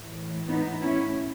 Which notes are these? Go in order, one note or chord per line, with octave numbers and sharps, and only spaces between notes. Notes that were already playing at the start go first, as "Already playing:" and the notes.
Already playing: A2 E3
B3 D#4
C#4 E4